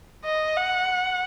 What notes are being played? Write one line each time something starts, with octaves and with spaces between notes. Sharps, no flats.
D#5
F#5